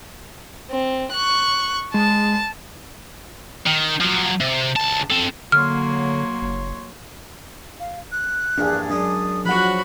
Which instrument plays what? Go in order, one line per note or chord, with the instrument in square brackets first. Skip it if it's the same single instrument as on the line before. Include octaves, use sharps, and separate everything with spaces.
[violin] C4
C#6 F#6
[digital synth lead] G#3 [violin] A5
[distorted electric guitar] D#3
F3 F#3
C3
C#2 A5
C4 A4
[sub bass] D3 [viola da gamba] F#3 A#3 [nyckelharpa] C#5 C6 [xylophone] F6
[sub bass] F#1
[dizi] F5
F#6
[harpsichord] A#1 E2 G2 [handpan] D4 G#4
[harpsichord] F#2 G#3 [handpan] D4 [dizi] D#6
[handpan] F3 F#3 F#5 [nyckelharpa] F#4 B5 [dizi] F#6